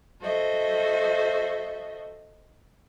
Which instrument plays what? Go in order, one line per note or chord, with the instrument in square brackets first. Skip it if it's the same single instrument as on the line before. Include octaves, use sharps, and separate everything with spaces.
[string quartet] F#4 A4 C5 D#5 E5